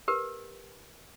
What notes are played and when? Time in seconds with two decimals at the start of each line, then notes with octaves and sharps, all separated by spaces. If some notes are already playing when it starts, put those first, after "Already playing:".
0.08 G4 A#4 B4